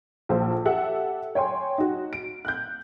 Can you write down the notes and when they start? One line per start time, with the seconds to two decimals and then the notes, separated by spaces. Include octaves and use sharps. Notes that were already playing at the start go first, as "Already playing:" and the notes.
0.29 A#1 A4 C5
0.65 G4 A4 E5 F#5
1.35 C#5 G5 G#5 C6
1.78 D#4 F#4
2.13 D7
2.45 F#6 G6